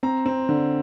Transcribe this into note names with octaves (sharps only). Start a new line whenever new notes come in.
C4 A#5
C4
D3